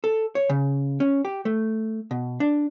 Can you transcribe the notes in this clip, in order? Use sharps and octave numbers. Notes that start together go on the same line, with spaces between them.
A4
C#5
C#3
C#4
G4
A3
B2
D4